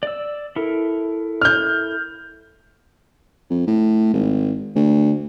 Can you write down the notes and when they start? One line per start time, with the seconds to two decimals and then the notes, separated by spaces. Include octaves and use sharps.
0.03 D5 E6
0.56 E4 A4 A#4
1.41 F6 G6
3.50 F2
3.67 A2
4.14 G#1
4.75 D2